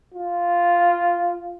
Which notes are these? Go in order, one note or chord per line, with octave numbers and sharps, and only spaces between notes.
F4